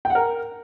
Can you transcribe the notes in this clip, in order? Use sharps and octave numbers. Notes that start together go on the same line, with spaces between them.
G5
F#5
A#4